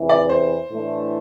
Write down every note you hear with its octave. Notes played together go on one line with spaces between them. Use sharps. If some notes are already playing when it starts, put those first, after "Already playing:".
Already playing: E2 C3 E3
D5
C5
A2 E3 A3 D4